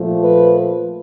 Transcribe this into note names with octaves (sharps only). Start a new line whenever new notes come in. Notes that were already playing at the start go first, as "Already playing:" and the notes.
Already playing: A#2 F3 A3
B4